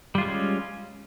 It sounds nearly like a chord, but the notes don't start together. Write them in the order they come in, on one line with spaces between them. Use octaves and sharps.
G3 F4 G#3 C#4